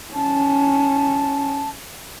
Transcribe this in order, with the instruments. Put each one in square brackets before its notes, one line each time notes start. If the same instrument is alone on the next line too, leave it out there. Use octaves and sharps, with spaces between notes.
[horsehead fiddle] C#4 [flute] A5